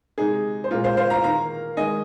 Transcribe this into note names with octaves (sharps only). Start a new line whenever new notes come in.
C3 G#3 D#4 G#4
C5
A#2 G#3 F4 A#4
C5 F5
C5 F5
F5 A#5
D#3 A#3 F5 A#5
D#3 G#3 D#5 G#5